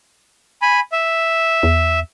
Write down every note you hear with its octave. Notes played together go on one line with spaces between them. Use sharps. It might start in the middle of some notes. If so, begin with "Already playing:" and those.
G#5 B5
E5
E2